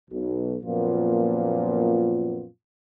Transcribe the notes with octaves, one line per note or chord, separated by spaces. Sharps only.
B1 B2
F#2 A#2 F3 A#3 B3 F4